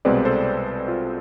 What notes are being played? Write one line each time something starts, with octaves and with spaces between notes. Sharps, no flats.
C2 B2 G#3 C4 B4 D5
A4 C5
F4